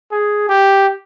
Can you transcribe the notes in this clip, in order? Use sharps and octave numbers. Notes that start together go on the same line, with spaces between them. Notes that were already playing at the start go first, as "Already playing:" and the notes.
G#4
G4